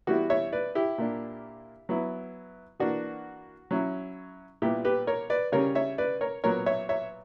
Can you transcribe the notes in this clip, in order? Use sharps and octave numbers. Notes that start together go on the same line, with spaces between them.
E3 G3 B3 E4 F#4
C#5 E5
B4 D5
E4 G4
A#2 A#3 D4
F#3 B3 E4
E3 A#3 D4 F#4
F#3 C#4 E4
A#2 G3 B3 E4 G4
G4 B4
A#4 C#5
B4 D5
C#3 G3 C#4 A#4 C#5
C#5 E5
B4 D5
A#4 C#5
A#2 F#3 B3 A#4 C#5
C#5 E5
C#5 E5